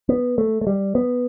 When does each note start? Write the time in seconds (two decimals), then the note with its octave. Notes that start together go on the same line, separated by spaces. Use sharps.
0.09 B3
0.38 A3
0.61 A3
0.67 G3
0.95 B3